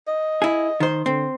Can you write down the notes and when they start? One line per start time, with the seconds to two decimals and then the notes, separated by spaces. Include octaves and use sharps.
0.08 D#5
0.42 E4 G#4
0.80 D#3 C5
1.06 D3 C4